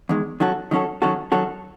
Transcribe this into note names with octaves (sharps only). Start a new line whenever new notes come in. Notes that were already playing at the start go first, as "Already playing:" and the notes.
E2 D#3 G#3
D#3 F#3 C#4 F#4 A4
D#3 F#3 C#4 F#4 A4
D#3 F#3 C#4 F#4 A4
D#3 F#3 C#4 F#4 A4